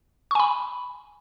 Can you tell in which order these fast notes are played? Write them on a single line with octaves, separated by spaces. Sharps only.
C#6 G#5 B5